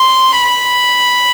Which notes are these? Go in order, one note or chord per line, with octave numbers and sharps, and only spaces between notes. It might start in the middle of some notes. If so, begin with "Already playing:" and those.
Already playing: C6
B5